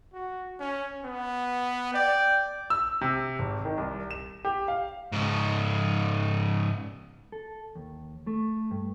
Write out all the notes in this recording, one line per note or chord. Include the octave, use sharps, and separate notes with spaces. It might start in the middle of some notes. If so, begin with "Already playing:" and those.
F#4
C#4
B3
D5 G5
E6
C3
G#1
D#3
C2
E7
G4
F5
G#2 C#3
A4
D#2
A3
G2